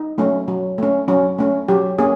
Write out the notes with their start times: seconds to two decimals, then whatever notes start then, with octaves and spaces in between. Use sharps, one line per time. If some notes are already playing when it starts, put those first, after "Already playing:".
Already playing: D#4
0.18 F#3 A3 C#4
0.48 F#3
0.78 A3 C#4
1.08 F#3 C#4
1.38 A3 C#4
1.68 F#3 G4
1.99 A#3 C#4 G#4